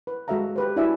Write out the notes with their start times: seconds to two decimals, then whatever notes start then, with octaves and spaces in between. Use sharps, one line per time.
0.07 B4
0.28 G#3 F#4 A4 E5 F5 A#5
0.56 G4 B4 C5
0.76 D4 E4 F#4 D5 E5 G#5